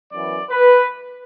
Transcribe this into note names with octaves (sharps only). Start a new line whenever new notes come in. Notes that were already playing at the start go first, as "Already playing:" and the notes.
F#2 E3 B3 D5
B4